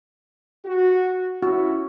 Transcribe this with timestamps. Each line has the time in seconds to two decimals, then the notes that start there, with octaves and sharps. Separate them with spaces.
0.65 F#4
1.43 C#4 E4 F#4